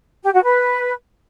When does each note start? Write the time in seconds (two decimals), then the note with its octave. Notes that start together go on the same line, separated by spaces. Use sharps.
0.23 G4
0.33 F#4
0.43 B4